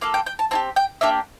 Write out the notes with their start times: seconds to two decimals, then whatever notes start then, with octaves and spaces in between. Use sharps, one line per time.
0.01 A#3 F4 A4 F5
0.14 G5
0.26 G5
0.39 A5
0.51 C4 E4 G4 A5
0.76 G5
1.01 A#3 D4 G4 E5